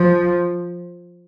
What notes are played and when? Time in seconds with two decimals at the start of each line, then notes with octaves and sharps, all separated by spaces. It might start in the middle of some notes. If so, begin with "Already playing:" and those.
Already playing: F3